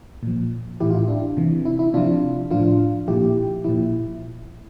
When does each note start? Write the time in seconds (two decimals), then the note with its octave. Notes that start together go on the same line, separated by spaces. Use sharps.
0.23 A#2 F3
0.80 A2 E3 E4 G4
0.90 F4
0.94 E4
1.08 D4
1.37 C3 E3
1.65 E4
1.79 E4
1.94 C3 F3 D4 F4
2.51 A2 F3 D4 F4
3.08 A#2 F3 E4 G4
3.64 A#2 F3 E4